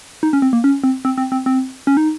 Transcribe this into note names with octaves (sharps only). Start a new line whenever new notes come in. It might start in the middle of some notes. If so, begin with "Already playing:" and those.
D#4
C#4
C4
A#3
C#4
C4
C4
C4
C4
C4
C#4
D#4